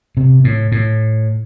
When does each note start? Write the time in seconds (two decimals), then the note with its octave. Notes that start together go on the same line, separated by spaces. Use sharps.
0.17 C3
0.44 A2
0.72 A2